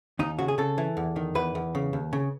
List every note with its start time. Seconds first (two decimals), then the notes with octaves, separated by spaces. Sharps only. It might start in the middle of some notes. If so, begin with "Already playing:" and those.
0.19 D#2 D#4
0.39 C#3 F#4
0.48 G#4
0.58 C#3 A4
0.78 E3
0.97 E2
1.16 D#3
1.35 E2 B4
1.55 E2
1.75 C#3
1.93 D#2
2.13 C#3